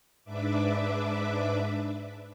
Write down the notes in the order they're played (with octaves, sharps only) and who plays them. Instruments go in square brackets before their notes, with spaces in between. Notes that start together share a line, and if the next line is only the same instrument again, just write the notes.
[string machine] G#2 D4 B4 E5 D6